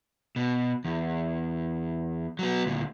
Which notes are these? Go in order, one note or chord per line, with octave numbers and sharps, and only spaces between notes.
B2
E2
F#3 B3
D2 A#2